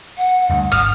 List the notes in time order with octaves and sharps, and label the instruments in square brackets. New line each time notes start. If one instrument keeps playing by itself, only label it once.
[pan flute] F#5
[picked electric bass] D2 G2
[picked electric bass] G#1 [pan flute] D#6 [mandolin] F6